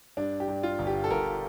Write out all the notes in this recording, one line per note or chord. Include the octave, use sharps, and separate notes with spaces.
G2 D4
G4
G2
F4
G1
G4
A4
G1 A#4